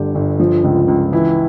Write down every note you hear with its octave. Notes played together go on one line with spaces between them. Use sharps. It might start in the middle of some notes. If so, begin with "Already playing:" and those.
Already playing: G1 D3 G4
G1
F3
C#2
C#2
E3 E4